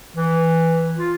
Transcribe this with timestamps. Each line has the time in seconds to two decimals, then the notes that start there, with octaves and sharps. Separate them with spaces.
0.17 E3
0.97 F4